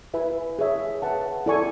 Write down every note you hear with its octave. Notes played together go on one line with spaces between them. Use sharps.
E4 B4 E5 G#5 B5
G#4 C#5 E5
B4 F#5 A5
E4 A4 D5 G#5 C#6